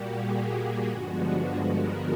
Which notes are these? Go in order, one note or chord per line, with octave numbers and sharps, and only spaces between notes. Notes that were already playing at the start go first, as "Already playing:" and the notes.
Already playing: A#2 G3 A#3 F#4 G4
G#4
G2 D3 F3 G#3 B3 F#4
A#4